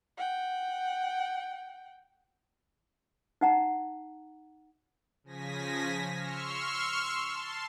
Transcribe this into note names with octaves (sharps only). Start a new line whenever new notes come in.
F#5 G5
D#4 F#5 A#5
C#3 F3 G#5 A#6 B6
C6 C#6 E6 F6
A5 C6